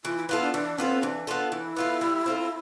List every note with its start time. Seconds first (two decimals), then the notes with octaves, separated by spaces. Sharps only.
0.04 E3 F4
0.17 E4
0.29 B3 E4 F4 A4
0.41 D4
0.54 E3 D4
0.78 B3 C4 F4 A4
1.03 E3 D4
1.27 B3 F4 A4
1.52 E3 E4
1.76 B3 F4 A4
2.01 G3
2.26 C4 F4 A4